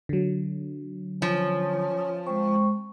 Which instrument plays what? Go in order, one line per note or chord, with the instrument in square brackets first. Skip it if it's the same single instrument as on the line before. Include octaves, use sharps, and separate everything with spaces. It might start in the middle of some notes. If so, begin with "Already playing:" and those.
[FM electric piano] D3 F#3
[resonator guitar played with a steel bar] F3 [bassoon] C#4
[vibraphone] G#3 C#6 [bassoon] C4